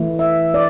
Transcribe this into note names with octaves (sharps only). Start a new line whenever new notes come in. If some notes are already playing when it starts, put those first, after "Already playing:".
Already playing: E3 A3 E4
E5
D5